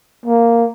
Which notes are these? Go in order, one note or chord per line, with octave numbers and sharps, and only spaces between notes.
A#3